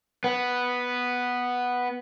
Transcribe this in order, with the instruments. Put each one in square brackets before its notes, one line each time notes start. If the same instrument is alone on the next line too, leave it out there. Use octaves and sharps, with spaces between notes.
[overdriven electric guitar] B3